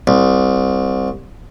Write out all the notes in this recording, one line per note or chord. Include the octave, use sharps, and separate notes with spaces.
C2